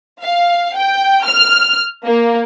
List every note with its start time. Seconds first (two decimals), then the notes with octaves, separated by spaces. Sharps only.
0.21 F5
0.76 G5
1.25 F6
2.04 A#3